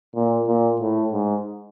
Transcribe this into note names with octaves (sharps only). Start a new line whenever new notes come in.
A#2
A#2
A2
G#2